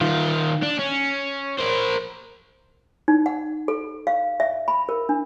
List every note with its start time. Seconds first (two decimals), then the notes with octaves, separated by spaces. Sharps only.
0.01 D#3 F4
0.62 D4
0.79 C#4
1.59 A#4 C5
3.08 D#4
3.26 F#5
3.68 A4
4.07 F5
4.40 E5
4.68 B5
4.89 A#4
5.09 D4